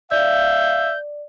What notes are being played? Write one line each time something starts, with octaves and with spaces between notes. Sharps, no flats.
D5 E5 F5 G6